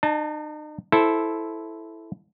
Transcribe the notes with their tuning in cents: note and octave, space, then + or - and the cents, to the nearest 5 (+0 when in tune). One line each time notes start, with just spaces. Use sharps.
D#4 -40 A5 +0
E4 +0 A4 -10 C5 +0